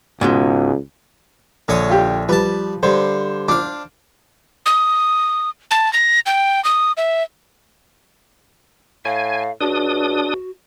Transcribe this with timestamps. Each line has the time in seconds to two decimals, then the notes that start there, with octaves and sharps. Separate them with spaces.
0.21 C#2 G#2 B2 G#3
1.68 A#1 D3 C#5 D#6
1.89 F4 G4
2.29 F3 G3 B4 A5
2.83 G2 D3 C5
3.48 D4 F5 D6
4.66 D#6
5.71 A5
5.93 A#6
6.26 G5
6.64 D#6
6.97 E5
9.05 A2 F5 G#5
9.61 C#2 D4 F#4 D#6